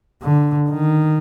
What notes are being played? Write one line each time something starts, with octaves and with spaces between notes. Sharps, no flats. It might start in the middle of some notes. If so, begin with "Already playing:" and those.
D3
D#3